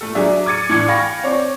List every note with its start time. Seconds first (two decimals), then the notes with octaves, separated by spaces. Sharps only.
0.01 A3 A4
0.15 F#3 D4 G#4 D5 E5
0.46 D6 G#6 A6 C#7 D#7
0.69 A2 E3 D4 D6 G#6 C#7
0.88 F5 G5 G#5 B5 C#6 A#6
1.23 C4 C#5 D5